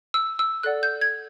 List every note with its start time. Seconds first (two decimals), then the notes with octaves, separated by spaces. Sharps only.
0.14 E6
0.39 E6
0.63 A4 D5 F#5 F#6
0.83 G6
1.01 G#6